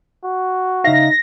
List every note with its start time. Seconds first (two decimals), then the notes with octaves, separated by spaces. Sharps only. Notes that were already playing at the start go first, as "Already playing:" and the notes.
0.24 F#4
0.84 C#3 D#4 E5 F5 A#6